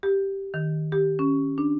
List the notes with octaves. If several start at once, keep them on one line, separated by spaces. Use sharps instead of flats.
G4
D#3
G4
C#4
D4